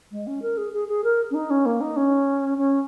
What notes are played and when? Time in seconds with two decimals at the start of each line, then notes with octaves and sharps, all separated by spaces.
0.11 G#3
0.27 C#4
0.42 A#4
0.57 G#4
0.73 G#4
0.88 G#4
1.04 A#4
1.31 C#4
1.34 D#4
1.50 C#4
1.66 A#3
1.81 D#4
1.96 C#4
2.58 C#4